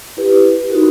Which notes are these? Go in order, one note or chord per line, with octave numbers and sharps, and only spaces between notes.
E4 G4 B4
D#4 F#4 A#4